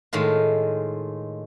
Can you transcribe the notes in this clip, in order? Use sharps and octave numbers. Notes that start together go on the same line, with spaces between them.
A2 D#3 G#3 F4